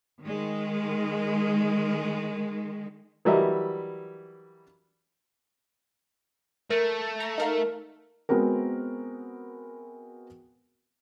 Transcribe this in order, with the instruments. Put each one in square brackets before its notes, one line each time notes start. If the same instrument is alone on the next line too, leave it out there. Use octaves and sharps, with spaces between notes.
[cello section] D#3 G#3
[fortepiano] E3 F#3 G3 A#4 D#5 E5
[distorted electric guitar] A3 [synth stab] A#4
[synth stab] A#5
D#4 A#4 F5
[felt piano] G#3 B3 C4 F#4 A#4